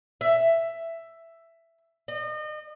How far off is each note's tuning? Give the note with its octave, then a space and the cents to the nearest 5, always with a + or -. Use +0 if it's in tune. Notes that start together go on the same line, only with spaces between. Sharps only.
E5 +10
D#5 -35